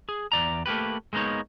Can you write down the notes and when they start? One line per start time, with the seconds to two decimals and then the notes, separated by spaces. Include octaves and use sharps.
0.09 G#4
0.32 E2 D5 A#5
0.66 A3 A#3 G4 B4
1.13 G#3 A#3 B3 D#4 C#5